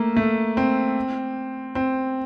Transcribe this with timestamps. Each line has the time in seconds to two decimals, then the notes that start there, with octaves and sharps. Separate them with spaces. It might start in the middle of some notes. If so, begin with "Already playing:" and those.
Already playing: A3 A#3
0.16 A3
0.57 C4
1.75 C4